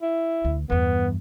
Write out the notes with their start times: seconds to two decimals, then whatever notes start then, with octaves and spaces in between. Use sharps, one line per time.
0.02 E4
0.45 D2
0.70 E2 G2 B3